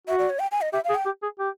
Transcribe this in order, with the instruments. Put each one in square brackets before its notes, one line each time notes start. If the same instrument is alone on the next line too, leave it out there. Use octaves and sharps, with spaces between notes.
[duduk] F#4 [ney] E5
[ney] D5
C#5
G5
G#5
D#5
[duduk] G4 [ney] E5
[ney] F5
[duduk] G#4
[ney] G5
[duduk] G4
G#4
G4